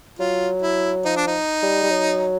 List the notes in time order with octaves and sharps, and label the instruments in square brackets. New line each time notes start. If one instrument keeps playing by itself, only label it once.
[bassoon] F#3 [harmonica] F4
[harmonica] E4
[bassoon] F3 [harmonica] D#4
[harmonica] D4
D#4
[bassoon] G3
G3
F#3